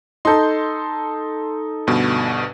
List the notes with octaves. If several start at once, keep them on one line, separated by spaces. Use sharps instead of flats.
D#4 A4 C6 G6
D2 G2 B2